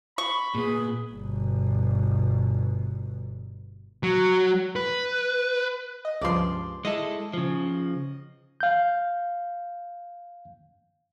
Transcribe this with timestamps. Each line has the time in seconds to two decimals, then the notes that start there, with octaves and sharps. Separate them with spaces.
0.18 B5 C#6
0.55 A#2 B3 G#4
1.13 G1 B2
4.03 F#3
4.76 B4
6.05 D#5
6.21 C#2 G2 F3 D5 C6
6.85 G#3 E4 A4 D#5
7.33 C#3 F3
8.60 F5 G6